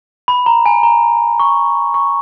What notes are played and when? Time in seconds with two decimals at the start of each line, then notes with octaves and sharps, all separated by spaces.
0.28 B5
0.46 A#5
0.66 G#5
0.83 A#5
1.40 C#6
1.94 C#6